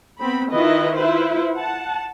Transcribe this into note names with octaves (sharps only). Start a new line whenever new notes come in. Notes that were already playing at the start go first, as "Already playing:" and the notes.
B3 C4 B5
D#3 E4 F4 B4 D#5
E4 F4 B4 C5
F#5 A5